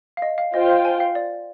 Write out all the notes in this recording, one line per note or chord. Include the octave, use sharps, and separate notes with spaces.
F5
D#5
F5
F4 C5 D#5 G5
F5
G#5
F5
D5